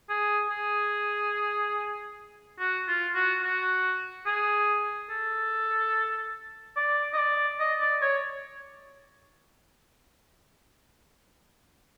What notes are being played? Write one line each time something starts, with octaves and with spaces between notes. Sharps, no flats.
G#4
G#4
F#4
F4
F#4
F#4
G#4
A4
D5
D#5
D5
D#5
D5
C#5